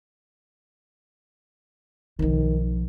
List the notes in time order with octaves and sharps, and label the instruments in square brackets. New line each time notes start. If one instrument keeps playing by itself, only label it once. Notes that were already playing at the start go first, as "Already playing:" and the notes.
[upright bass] B1 F3 [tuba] D#3